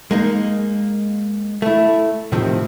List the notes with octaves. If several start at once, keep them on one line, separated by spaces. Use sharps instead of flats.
G#3 A#3 D#4
A3 E4
A2 C3 D#3 F3 C4